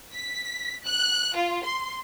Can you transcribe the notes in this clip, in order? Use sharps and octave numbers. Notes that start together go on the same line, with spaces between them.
B6
F#6
F4
C6